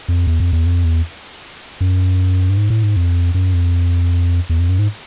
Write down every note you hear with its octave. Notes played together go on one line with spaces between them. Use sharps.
F2
E2
F2
E2
F2
E2
F#2
G2
G#2
A2
G#2
F2
F#2
F2
E2
F2
F#2
G#2